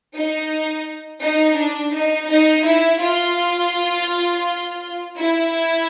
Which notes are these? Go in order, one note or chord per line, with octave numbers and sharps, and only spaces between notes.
D#4
D#4
D4
D#4
D#4
E4
F4
E4